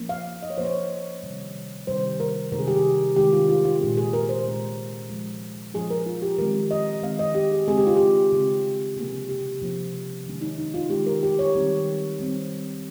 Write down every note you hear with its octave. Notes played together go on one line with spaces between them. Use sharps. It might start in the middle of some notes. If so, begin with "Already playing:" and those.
Already playing: F3 A#3 C#4
F5
D#5
C#5
F3 A#3 C#4 C5
C#5
C3 D#3 G3
C3 D#3 G3 C5
A#4
C3 D#3 G#3 A#4
G#4
G4
G#4
C3 D#3 G#3 G4
F4
F4
F4
A#2 G#3 C#4 G#4
G#4
A#4
C5
A#2 G#3 C#4
F3 G#3 C#4
F3 G#3 C#4 G#4
A#4
F4
G4
D#3 G#3 C4 A#4
D#5
D#3 G#3 C4 F5
D#5
G4
G#4
C#3 G#3 C4 G#4
G4
F4
G4
C#3 G#3 C4
C3 F3 A#3 C#4 G#4
G4
C3 F3 A#3 C#4
D#3 G#3 C#4
D#4
D#4
F4
D#3 G#3 C#4 G4
A#4
G4
C#5
D#3 G3 C4
D#3 G3 C4